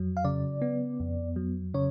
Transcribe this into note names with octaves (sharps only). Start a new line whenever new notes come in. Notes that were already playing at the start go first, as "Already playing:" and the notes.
Already playing: F2 F#3
F5
C#3 D5
B3
F2
F#3
C#3 C#5